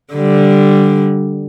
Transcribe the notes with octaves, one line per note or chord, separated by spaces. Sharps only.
D3 G3